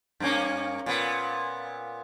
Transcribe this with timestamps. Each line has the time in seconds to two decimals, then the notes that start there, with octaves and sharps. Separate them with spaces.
0.20 G2 A#3 C#4
0.86 A#2 B3